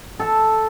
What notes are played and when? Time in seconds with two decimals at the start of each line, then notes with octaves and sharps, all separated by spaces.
0.19 A4